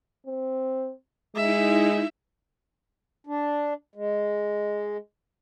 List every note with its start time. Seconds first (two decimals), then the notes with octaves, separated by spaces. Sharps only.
0.27 C4
1.36 G#3 D#4 E4 E5
3.27 D4
3.95 G#3